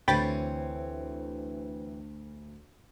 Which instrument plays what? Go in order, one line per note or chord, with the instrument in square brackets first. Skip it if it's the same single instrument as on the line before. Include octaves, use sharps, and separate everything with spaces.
[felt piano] D2 [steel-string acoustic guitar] E3 C4 C#5 [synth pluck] G5 B5 A6